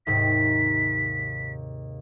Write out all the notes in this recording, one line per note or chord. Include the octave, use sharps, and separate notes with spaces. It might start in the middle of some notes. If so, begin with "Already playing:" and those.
D#2 G#2 C3 B6